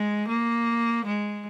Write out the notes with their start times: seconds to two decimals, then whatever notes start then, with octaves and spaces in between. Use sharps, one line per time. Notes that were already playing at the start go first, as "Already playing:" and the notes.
Already playing: G#3
0.28 A#3
1.05 G#3